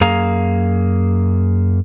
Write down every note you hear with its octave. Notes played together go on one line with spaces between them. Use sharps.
F#2 A#3 G#4 F5 A#5